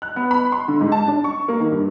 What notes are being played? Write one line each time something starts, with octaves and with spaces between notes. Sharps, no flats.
F#6
B3
B5
C6
D3
G#2
A5
D4
C#6
A#3
D#3
G2